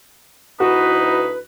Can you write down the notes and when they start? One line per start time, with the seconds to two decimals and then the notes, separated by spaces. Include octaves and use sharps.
0.60 D2 D#4 E4 F#4 B4